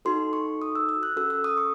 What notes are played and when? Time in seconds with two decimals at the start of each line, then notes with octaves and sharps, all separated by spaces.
0.05 D#4 F#4 A4 C6
0.33 C#6
0.62 D#6
0.75 E6
0.89 E6
1.03 F#6
1.17 C#4 F#4 A4 E6
1.30 E6
1.44 D#6
1.57 C#6